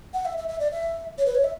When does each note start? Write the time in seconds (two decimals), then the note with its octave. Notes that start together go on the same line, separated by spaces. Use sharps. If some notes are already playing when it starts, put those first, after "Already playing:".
0.14 F#5
0.25 E5
0.37 E5
0.48 E5
0.60 D5
0.72 E5
1.18 C#5
1.26 B4
1.35 C#5
1.44 E5